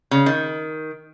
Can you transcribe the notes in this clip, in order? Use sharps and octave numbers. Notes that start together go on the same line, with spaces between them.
C#3
D#3